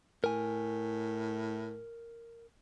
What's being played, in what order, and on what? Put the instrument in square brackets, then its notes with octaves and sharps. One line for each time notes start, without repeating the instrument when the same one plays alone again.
[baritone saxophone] A2 [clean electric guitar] A#4 G#5